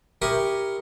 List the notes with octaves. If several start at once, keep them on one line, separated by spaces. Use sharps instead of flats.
E4 G4 A#4 C#6 D#6